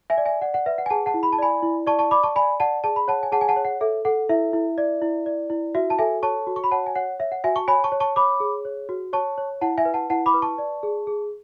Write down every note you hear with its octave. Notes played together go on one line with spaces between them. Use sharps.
E5 G#5
D5
E5 G#5
D5 F#5
F#5
B4 E5
F#5
G#5
G#4 F#5 A5
F#5 A5
E4
B5
A5
D5 G#5 B5
E4
D5 A5 C#6
A5 C#6
D5 B5 D6
A5 C#6
D5 G#5 B5
D5 F#5 A5
G#4 A5
B5
C#5 F#5 A5
G#5
G#4 F#5 A5
G#5
F#5 A5
C#5
F#5
A4 E5
A4 F#5
E4 E5
E4
D5
E4
D5
E4
F#4 E5
A5
A4 E5 G#5
C#5 A5 C#6
F#4
C#6
B5
C#5 F#5 A5
G#5
C#5 F#5
C#5 E5
F#5
F#4 E5 G#5
A5 C#6
C#5 G#5 B5
A5 C#6
C#5
A5 C#6
C#5 B5 D6
G#4
C#5
F#4
C#5 A5 C#6
C#5
E4 F#5 A5
E5 G#5
B4
F#5 A5
E4 F#5 A5
B5 D6
B4
A5 C#6
D5
G#4
G#4